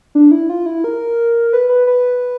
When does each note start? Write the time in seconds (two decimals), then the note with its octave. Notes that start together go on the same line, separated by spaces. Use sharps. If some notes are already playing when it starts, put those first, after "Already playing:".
0.15 D4
0.31 E4
0.50 F4
0.66 E4
0.84 A#4
1.53 B4
1.69 B4
1.87 B4